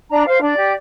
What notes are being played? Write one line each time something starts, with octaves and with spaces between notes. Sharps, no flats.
D4 A#5
C5 F5
D4 D5
G4